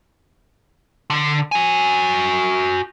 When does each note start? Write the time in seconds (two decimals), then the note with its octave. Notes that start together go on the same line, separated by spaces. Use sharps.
1.10 D3
1.52 F#4 G#5